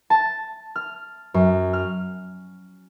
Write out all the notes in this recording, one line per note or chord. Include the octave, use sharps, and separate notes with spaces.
A5
F6
F#2
F6